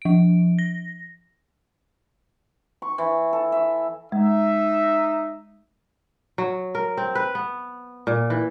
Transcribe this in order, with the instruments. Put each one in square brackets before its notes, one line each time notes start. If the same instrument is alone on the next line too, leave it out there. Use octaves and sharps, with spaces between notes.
[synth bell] F3 D7
A#6
[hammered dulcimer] C#6
E3
A4
E5
[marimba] G#3 [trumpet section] D#4 E5
[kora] F#3
A#4
C4
B4
B3
A#2
E3